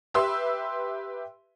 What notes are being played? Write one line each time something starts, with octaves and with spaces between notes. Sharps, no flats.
G4 B4 E5 C6 E6